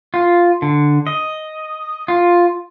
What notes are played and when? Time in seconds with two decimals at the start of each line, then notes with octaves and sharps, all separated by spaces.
0.14 F4
0.62 D3
1.07 D#5
2.08 F4